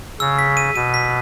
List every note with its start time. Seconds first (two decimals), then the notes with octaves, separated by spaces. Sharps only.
0.20 C#3 E6
0.39 B6
0.57 D#7
0.75 B2 D#7
0.94 B6